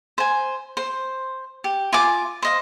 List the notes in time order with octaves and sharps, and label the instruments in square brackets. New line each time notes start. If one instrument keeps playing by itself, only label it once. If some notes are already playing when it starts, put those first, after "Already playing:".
[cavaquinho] C5 G#5
C5
G4
F4 G#5 D6
C5 D#5 F5